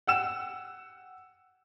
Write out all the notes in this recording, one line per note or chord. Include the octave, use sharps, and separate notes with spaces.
F#5 G5 E6 E7